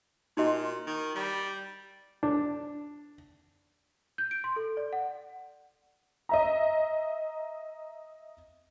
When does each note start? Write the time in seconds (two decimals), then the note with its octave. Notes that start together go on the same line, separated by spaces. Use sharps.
0.37 A#2 D#4 F#4 D#5
0.87 D#3
1.15 G3
2.23 D4
4.18 G6
4.31 D7
4.44 C6
4.56 A4
4.77 D5
4.93 F#5
6.29 D#5 E5 A#5